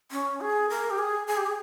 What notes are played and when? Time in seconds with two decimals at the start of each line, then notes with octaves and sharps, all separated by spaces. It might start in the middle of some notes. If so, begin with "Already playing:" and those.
0.12 C#4
0.41 G#4
0.70 A#4
0.90 G4
0.98 G#4
1.27 G#4
1.37 G4
1.46 G#4